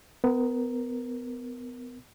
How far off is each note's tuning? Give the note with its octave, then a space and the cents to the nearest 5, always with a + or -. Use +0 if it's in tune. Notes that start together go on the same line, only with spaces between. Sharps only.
B3 +30 A#4 +0